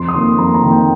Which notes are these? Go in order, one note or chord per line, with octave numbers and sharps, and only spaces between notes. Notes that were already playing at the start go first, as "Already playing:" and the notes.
Already playing: F2 C6
D#6
D#3 A#3 C6
F2 A#5
A#5
D#3 A#3
G5